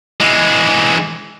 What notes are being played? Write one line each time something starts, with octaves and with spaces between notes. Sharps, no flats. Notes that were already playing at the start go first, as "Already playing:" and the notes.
E3 G#3